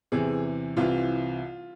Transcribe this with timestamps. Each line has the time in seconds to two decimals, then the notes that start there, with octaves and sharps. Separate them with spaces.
0.12 E2 C3 E3 G#4
0.77 C2 C3 E3 F4